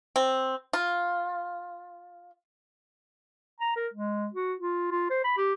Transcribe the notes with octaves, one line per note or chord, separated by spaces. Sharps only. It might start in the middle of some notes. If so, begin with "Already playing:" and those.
C4
F4
A#5
A#4
G#3
F#4
F4
F4
C5
B5
G4